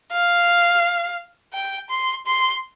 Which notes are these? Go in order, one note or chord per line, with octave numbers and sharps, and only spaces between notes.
F5
G5
C6
C6